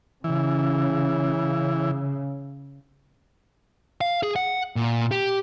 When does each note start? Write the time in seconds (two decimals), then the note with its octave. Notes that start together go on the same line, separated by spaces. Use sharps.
0.24 C#3 E3
4.01 F5
4.23 G#4
4.36 F#5
4.76 A#2
5.11 G4